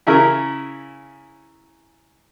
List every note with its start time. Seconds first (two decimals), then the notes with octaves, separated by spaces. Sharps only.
0.07 C#3 E4 A#4